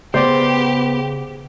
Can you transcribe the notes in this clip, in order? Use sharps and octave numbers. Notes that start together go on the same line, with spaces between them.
C#3 B3 G4 C5 D5